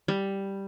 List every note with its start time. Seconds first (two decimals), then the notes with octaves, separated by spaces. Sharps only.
0.08 G3